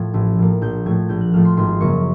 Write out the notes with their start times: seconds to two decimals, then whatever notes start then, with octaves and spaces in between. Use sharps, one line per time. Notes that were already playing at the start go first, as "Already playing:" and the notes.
Already playing: A2 F3 G#6
0.14 A1
0.38 A2 F3 A#3
0.61 A#1 G6
0.86 A2 F3 A3 G#6
1.09 A#1 G6
1.21 F#6
1.33 A2 F3 A3 F6
1.45 C6
1.57 G#1 C6
1.80 F#2 C#3 F#3 A#3 C#6